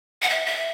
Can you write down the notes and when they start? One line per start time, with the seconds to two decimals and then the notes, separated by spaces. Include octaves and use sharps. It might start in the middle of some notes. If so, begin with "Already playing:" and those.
0.22 F#5
0.30 E5
0.46 E5